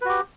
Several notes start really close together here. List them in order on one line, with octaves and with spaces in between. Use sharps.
B4 F#4 G4